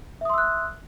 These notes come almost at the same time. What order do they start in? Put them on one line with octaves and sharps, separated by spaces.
E5 D#6 C6 E6 F#6